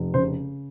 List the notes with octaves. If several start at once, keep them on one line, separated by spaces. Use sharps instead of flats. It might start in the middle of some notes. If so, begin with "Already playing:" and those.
Already playing: F1
C#3 C5